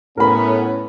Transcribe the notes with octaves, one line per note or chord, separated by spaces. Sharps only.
A2 B3 C#4 A#4 B5